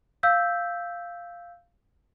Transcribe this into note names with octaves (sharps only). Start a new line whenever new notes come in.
F5 E6 G6 B6